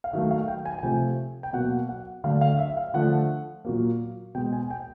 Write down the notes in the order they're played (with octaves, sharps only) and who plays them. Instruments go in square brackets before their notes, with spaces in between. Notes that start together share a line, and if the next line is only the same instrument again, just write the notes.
[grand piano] F5
D#3 F#3 A3 E5
F5
G5
G#5
G#5
C3 F3 A3 G5
G5
B2 F#3 A#3 F#5
F#5
D3 F#3 A3 F5
F5
E5
F5
D3 F3 A3 F#5
A#2 F#3 A#3
B2 G5
G#3
G#5
G5